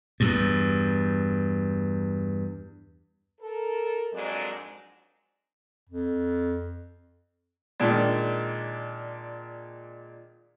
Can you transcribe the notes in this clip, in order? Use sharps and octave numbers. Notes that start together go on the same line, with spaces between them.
E2 G2
A4 A#4
F2 G#2 F#3 G#3 D4 A#4
F2
A#2 D#3 G#3 D4